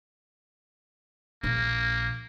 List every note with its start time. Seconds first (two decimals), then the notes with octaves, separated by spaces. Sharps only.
1.43 A#1 A#2 A#3